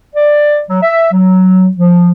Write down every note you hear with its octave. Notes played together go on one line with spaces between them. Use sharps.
D5
F#3
E5
F#3
F3